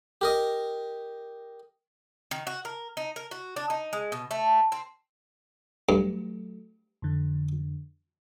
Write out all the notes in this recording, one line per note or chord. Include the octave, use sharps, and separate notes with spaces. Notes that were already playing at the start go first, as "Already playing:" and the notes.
G4 A#4 D#5
D#3
F#4
A#4
D#4
A#4
F#4
D4
D#4
G#3
B2
A3
C4
G2 F#3 A3
F2 D3